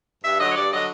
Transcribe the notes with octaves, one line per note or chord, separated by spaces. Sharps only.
G2 E5
D3 F#3 D#5
C#5
G2 D5
D3 F#3 D#5